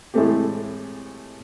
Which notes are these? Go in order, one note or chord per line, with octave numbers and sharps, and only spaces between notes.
A2 E3 G#3 A3 C4 G4